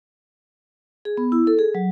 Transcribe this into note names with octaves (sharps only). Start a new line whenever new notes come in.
G#4
B3
E4
A4
G#4
F#3